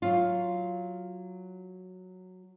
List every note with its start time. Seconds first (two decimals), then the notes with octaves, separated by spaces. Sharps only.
0.02 F#3 F4